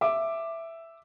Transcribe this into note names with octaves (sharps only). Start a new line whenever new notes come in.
E5 D6